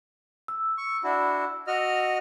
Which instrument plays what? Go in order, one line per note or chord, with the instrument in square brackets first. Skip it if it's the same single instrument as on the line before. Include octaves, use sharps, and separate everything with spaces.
[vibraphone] E6
[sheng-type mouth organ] C#6
D4 E4 F#4
F#4 D#5 F6